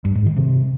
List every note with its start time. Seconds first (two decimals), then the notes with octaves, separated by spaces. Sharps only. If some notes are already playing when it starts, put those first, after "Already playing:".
0.05 G2
0.15 G#2
0.26 D#3
0.36 C3